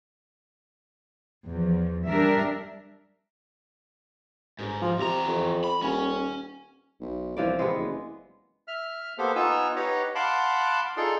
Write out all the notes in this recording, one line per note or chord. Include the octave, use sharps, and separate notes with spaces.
E2 F3
G3 D4 A#4 E5
G1 G#2
F3
E2 C3 A#5
F2
B5
D#1 C#4
B1
C2 E3 F3 D5
C3 G#3 B3
F#1
E5 F6
A#3 B3 G4 A4 C5
B3 D#4 F4 G#5 E6
D#4 G4 B4 C#5 D#5 F#5
F5 F#5 A5 B5 C6 D6
D#4 F4 G#4 A4 D5 C6